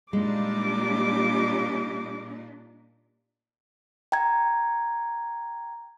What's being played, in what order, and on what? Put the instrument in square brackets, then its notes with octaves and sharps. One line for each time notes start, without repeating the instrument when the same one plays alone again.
[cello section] A#2 D4 D#4 [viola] G3 D6 [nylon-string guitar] G#3
[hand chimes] G5 A#5 G#6